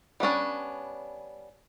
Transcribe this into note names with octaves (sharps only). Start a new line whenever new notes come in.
G3 B3 C#4 D4